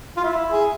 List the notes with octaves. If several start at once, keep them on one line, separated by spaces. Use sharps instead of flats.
F4
E4
G#4